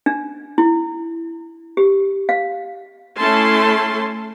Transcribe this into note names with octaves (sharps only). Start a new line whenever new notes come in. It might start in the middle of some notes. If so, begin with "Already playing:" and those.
D4
E4
G4
F5
A3 C#4 E4 A5 C6